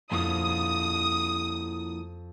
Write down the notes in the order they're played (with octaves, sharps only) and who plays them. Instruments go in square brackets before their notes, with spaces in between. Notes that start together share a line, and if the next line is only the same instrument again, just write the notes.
[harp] F2 [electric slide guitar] F3 A#3 E4 [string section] D#6